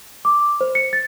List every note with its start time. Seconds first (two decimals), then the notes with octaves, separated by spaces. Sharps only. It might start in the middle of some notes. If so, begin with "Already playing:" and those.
0.25 D6
0.61 C5
0.75 C#7
0.93 A6